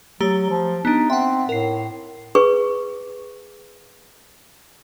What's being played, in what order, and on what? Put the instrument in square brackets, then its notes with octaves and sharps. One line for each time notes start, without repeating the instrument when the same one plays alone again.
[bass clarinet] F#3 [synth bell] A3 G4 A#5
[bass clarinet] F3
[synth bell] B3 D4 [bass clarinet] D#4
[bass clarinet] C4 [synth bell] E5 F#5
[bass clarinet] A2 [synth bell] A#4 C7
[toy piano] G#4 B4 C#6